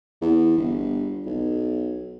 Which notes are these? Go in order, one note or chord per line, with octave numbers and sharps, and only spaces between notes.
E2
G1
B1